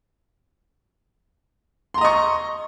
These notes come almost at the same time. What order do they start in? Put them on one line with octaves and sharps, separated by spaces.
C6 A#5 D#5 C#6